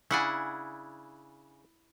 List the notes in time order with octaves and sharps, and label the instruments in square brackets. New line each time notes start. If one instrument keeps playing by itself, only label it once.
[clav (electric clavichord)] C#3 D4 [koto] E4 F#5 G#5